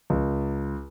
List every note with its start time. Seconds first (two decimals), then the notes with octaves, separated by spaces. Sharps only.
0.10 C#2